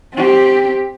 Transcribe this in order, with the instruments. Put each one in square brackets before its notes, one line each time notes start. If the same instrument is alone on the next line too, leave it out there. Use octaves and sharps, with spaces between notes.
[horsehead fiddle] C4 G4